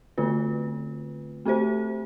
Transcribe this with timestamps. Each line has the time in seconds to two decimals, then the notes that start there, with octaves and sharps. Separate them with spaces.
0.18 D3 A3 C4 F4 B4
1.46 A3 C4 G4 C5